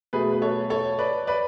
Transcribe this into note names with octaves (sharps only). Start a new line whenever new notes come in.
B2 F#3 A3 G#4 B4
B4
A4 C#5
A4 C#5
B4 D5
B4 D5